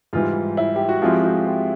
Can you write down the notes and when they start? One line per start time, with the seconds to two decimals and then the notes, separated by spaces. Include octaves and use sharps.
0.13 G#2 E3 G3 F4
0.57 E4
0.76 G4
0.89 F#4
1.02 F3 G#3 C4 E4 F4 G4
1.24 F#4
1.47 G4